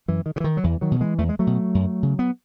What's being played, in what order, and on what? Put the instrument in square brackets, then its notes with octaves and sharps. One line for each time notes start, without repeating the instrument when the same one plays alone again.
[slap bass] F#2 E3
D#3
C#3
E3
D#3
F#3
E2 E3
D#3 F#3
B2
E3 G#3
E2 A3
G#3
F#3 A3
B2
F#2
C#3
B3